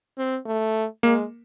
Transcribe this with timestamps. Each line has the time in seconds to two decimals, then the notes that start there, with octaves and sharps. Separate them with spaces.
0.18 C4
0.46 A3
1.03 G#3 A#3